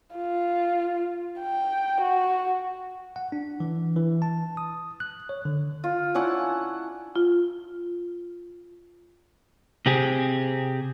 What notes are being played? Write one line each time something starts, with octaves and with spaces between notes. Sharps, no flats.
F4
G5
F#4
F#5
D4
E3
E3
A5
D#6
F#6
C#5
D3
F4
C#4 D4 E4 F#5
F4
C3 C4 G4 G#4